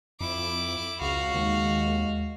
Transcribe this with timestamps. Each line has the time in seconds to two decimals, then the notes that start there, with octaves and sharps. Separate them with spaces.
0.21 F2 E4 D6
1.01 C#2 F#4 F5
1.34 D#2 G#3